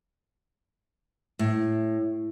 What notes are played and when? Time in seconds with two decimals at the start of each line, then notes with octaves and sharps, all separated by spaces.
1.39 A2